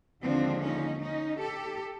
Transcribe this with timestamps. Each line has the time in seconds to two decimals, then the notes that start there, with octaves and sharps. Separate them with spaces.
0.23 D#2 D3 F3 G#3 C4 D4
0.62 C#4 D#4
1.00 C#4 D#4
1.39 G4 A4